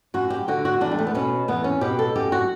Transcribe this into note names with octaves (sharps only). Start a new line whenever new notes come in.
F#2 F#4
G4
D3 F#4
F#4
E2 D4
G3
A3
B3
B2 C#4
E2 B3
C#4
B2 G4
A4
F#2 G4
F#4